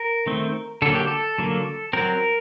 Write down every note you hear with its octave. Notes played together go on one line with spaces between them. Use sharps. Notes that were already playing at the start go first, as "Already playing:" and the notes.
Already playing: A#4
D#3 A3 C4
D3 F#3 A#3 A4
G4
A4
D3 F#3 A#3
F#3 C4 A#4